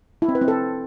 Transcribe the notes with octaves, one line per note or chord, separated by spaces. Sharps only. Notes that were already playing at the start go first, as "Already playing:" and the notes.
E4
C4
B4
C4
A4